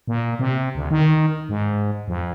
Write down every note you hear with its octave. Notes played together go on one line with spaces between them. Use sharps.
A#2
C3
D2
D#3
G#2
F2